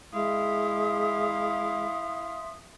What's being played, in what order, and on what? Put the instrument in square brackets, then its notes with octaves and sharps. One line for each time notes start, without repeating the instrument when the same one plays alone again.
[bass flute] G#3 [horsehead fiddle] E4 F5 [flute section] E5 C6 D#6